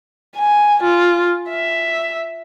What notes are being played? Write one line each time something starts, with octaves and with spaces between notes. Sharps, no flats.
G#5
F4
E5